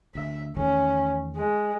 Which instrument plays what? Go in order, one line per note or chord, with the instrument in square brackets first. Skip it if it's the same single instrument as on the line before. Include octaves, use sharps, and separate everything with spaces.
[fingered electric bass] D2 [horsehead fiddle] E5
[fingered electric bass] E2 D#3 A3 [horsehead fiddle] C#4
[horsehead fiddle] G#3